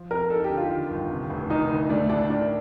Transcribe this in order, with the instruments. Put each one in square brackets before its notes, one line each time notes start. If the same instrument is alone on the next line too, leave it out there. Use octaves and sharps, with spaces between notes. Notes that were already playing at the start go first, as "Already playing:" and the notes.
Already playing: [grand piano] F3
[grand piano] F2 [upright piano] A#4
[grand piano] D#4 [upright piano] A4
[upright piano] G4
[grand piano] D3
[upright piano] F4
[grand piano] D#3
G1
C3
F1
[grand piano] D#3 [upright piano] D#4
[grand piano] D2
[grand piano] A3 [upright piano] D4
[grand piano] A2 [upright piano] D4
[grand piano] D#3 [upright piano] D4